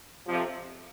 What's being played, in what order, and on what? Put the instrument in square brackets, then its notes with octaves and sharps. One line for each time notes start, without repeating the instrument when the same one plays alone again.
[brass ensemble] F2 C3 F3